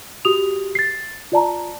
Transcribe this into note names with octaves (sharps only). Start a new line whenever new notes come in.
F#4 G4 D#6 F7
A6 C7
F4 D5 A5 A#5